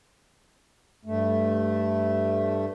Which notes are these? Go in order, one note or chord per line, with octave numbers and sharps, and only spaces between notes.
G2 A3